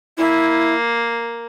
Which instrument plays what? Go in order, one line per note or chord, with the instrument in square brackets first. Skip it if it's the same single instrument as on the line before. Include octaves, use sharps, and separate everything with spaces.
[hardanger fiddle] A#3 [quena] E4